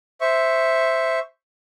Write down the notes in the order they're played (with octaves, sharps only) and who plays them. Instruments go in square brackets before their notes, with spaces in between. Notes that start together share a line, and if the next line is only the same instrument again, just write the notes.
[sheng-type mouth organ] C5 E5 C#6